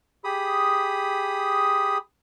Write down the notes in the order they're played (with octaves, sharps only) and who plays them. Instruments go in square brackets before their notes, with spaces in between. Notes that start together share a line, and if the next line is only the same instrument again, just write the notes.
[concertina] G4 G#4 B5 D#6